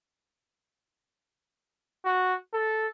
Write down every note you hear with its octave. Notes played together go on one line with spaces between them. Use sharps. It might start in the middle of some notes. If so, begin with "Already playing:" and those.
F#4
A4